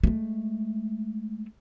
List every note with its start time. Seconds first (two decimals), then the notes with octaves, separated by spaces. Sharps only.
0.03 G#3 A3